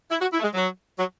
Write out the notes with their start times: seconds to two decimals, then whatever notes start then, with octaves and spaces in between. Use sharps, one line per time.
0.11 E4
0.21 F#4
0.33 E4
0.40 A3
0.43 G#3
0.54 F#3
0.99 F#3